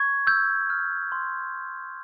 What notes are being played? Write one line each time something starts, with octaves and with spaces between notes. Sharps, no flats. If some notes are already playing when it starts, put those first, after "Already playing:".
Already playing: C#6 G#6
E6 G6
F6
C6